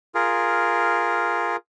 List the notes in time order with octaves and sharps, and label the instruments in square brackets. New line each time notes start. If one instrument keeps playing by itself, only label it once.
[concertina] F4 G#4 A#4